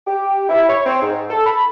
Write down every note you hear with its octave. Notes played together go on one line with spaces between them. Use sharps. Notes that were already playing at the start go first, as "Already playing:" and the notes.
G4
E4
C#5
C4
G#2
A4
B5